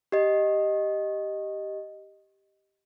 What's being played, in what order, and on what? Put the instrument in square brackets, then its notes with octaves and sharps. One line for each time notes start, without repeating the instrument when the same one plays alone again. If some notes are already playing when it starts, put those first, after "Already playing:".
[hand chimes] G4 D#5